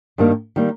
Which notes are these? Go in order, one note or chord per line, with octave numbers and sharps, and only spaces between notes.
G2 D#3 G3 A#3
D#3 G3 A#3